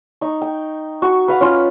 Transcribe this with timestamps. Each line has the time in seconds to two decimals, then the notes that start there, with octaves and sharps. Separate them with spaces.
0.21 D#4 C#6
0.41 G5
1.02 F#4 C#6
1.28 B4 F5 F#5
1.41 C#4 F4